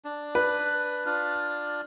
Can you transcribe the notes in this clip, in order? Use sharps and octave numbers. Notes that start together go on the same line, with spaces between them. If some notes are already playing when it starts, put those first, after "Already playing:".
D4
B4
D4 F4